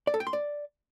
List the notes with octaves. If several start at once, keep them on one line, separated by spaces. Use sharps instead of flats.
D5
A4
G5
C6
D5